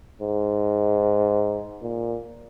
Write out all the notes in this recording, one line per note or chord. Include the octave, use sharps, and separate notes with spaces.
G#2
A#2